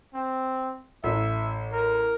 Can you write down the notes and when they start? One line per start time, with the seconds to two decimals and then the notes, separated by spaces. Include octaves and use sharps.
0.14 C4
1.04 A1 E5
1.73 A#4